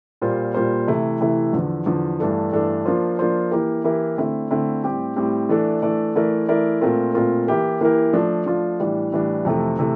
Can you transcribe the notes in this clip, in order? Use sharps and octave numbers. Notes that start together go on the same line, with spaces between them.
A#2 G3 A#3 F4 C5
A#2 G3 A#3 F4 C5
C3 E3 A3 E4
C3 E3 A3 E4
E2 D3 F3
E2 D3 F3
G2 E3 A3 D4 A4
G2 E3 A3 D4 A4
F3 A#3 D4 F4 C5
F3 A#3 D4 F4 C5
E3 A#3 E4 G4 A#4
E3 A#3 E4 G4 A#4
D3 A3 C4 E4
D3 A3 C4 E4
A2 G3 C4 G4
A2 G3 C4 G4
E3 A3 D4 A4 D5
E3 A3 D4 A4 D5
E3 A3 E4 A#4 D5
E3 A3 E4 A#4 D5
A#2 A3 C4 F4 A#4
A#2 A3 C4 F4 A#4
E3 A#3 E4 G4 A#4
E3 A#3 E4 G4 A#4
F3 A3 D4 F4
F3 A3 D4 F4
A2 E3 G3 D4
A2 E3 G3 D4
F2 C3 E3 A3
C3 E3 A3